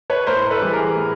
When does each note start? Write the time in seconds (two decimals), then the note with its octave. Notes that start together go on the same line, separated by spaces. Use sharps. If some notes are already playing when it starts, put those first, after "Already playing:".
0.10 B4 C#5
0.27 A2 A#4 C5
0.51 A4 B4
0.61 E3 G3
0.73 G#4 A#4
0.96 A2